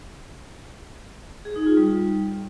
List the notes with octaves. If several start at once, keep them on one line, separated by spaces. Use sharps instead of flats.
G#4
D#4
F4
G3